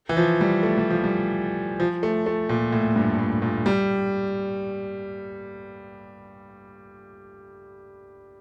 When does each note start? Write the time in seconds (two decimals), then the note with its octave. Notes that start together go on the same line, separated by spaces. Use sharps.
0.09 E3
0.17 F3
0.41 G3
0.63 A3
0.77 G3
0.90 F3
1.04 G3
1.80 F3
2.03 A3
2.26 A3
2.49 A#2
2.73 A2
2.96 G2
3.19 A2
3.42 A#2
3.66 G3